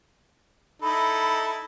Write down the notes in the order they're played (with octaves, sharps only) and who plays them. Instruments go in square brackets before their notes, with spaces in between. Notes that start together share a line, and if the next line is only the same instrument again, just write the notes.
[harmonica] D#4 E4 A4 [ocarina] B5